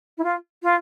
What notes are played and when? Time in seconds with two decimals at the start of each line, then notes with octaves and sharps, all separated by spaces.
0.17 E4
0.23 F4
0.63 F4